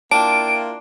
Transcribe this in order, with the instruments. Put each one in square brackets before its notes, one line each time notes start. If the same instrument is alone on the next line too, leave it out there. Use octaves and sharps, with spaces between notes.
[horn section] A#3 E4 F4 [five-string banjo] D4 [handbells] G5 A5 [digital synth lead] D7